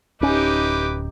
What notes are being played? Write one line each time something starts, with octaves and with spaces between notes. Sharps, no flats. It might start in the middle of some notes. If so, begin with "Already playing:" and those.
D1 C#4 D#4 E4 G4 B4 D6